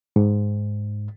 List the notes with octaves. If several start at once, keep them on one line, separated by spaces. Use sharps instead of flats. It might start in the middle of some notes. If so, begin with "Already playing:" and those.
G#2